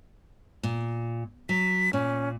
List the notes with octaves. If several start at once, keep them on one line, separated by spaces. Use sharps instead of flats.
A#2
F#3 B6
A#2 C#4